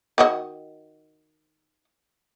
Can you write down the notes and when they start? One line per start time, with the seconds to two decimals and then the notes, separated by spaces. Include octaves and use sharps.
0.18 D#3 F#4 D#5